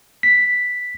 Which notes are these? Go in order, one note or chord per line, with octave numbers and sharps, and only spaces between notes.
B6